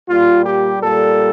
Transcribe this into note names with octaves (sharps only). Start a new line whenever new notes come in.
A#2 G3 F4
G4
A#2 G3 A4